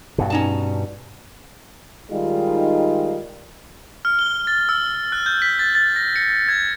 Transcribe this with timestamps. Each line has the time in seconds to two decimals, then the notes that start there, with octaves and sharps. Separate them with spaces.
0.18 G2 B2
0.30 C#4 D#4 A5
2.11 D#3 G3 G#3 D#4 F4
4.05 F6
4.19 G7
4.47 A6
4.69 E6
5.12 F#6
5.26 G6
5.42 B6
5.59 A6
5.75 A6
5.96 A#6
6.16 C#7
6.48 G#6